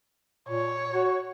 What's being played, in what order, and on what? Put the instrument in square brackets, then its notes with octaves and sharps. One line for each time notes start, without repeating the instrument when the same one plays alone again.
[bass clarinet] A#2 [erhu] C#5
[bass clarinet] F#4